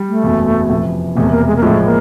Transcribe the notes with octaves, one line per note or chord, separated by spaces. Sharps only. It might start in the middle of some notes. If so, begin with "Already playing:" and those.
Already playing: G3
A3
F#1 E2 B2
F2 C3 E3
E1 E2 C3 A3
A#3
G#3
A#3
A1 A2 F3 G#3 A3
A#3